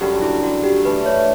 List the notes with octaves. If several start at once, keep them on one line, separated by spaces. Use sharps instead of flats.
F#2 D3 G3 G4
E4
F#4
G4
E3 A3 D4 B4
C#5